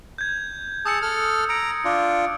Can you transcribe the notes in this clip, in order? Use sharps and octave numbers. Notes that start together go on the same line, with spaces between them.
G6 G#6
G#4 A5 D#6 E6 C#7
A4 F6
A#5 C#7 D7
D4 F4